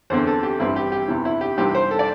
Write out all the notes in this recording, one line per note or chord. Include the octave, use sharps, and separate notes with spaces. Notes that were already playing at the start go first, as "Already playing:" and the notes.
E2 D3 C4 C5
A4
G4
A1 G2 E3 G3 C4 E4
G4
G4
E2 C3 E3 E4
E4
G4
C2 C3 E3 G3 C4 G4
C5
A4
D5